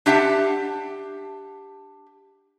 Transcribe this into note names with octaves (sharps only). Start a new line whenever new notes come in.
D4 G4 E5 F#5 A5